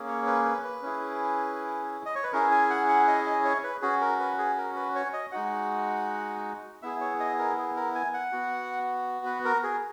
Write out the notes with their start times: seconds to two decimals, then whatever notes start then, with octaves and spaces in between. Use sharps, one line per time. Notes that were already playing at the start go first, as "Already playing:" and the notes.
Already playing: A#3 C#4 G#4
0.08 C#5
0.27 B4
0.45 B4
0.64 B4
0.82 C#4 E4 G#4
2.05 D#5
2.15 C#5
2.23 B4
2.33 C#4 E4 G#4 A#4
2.51 G#5
2.70 F#5
2.88 F#5
3.08 D#5
3.26 D#5
3.45 C#5
3.64 B4
3.82 C#4 F#4 G#4
4.01 A#4
4.20 B4
4.38 G#4
4.58 A#4
4.76 B4
4.95 C#5
5.13 D#5
5.32 G#3 D#4 F#4 F#5
6.82 B3 E4 G#4 E5
7.01 C#5
7.20 D#5
7.39 A#4
7.57 G#4
7.76 A#4
7.95 G#5
8.14 F#5
8.32 B3 F#4
9.26 B4
9.45 A#4
9.63 G#4